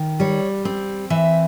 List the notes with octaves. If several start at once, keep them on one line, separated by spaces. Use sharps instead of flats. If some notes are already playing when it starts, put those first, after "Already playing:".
Already playing: D#3
G3 C#5
C4
E3 E5